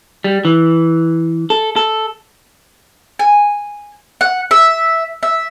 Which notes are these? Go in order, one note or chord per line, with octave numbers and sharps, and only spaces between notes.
G3
E3
A4
A4
G#5
F#5
E5
E5